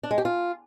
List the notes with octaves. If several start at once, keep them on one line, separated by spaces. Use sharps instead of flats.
D4
G#3
G4
F4